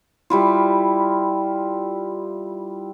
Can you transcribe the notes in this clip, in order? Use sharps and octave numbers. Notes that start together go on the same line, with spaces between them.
G3 E4 F4